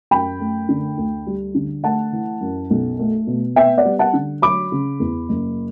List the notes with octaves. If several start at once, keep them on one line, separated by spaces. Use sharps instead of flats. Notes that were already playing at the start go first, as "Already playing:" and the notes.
F#2 G5 B5
A3
D3
D2
G3
D3
A3 F#5 A5
E3
F#2
B1
A3
B2
B3 E5 G5
D5 F#5
G3
F#5 A5
D3
F#3 B5 D6
C#3
E2
F#1